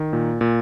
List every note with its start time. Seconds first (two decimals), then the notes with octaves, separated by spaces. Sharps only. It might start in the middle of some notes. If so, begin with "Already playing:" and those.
Already playing: D#3
0.13 A#2
0.41 A#2